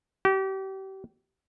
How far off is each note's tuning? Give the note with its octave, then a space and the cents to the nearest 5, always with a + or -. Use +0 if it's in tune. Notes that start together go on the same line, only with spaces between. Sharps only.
G4 -35